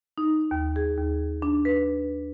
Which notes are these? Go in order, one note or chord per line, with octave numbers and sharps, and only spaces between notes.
D#4
D#2
G#4
D#2
D4
B4